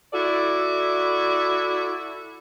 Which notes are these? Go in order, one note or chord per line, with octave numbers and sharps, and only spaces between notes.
E4 F#4 A4 D5